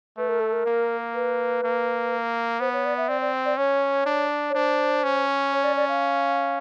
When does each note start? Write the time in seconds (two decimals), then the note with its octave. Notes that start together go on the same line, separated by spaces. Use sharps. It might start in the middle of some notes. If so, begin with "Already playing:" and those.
0.18 A3 B4
0.28 A#4
0.40 A4
0.53 A#4
0.66 A#3
1.14 B4
1.64 A#3
2.60 B3 C5
2.73 C#5
2.85 D5
2.97 E5
3.09 C4 D5
3.21 D5
3.45 D5
3.58 C#4 C#5
4.06 D4
4.50 C#5
4.55 D4 C5
5.04 C#4
5.53 C#5
5.64 D5
5.76 D5
5.89 F5